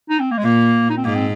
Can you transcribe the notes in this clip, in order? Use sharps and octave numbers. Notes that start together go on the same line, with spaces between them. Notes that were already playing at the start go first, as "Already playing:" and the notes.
D#4
C4
A#3
G#3
A#2 A#3
D#4
C4
G#2 A#3
C4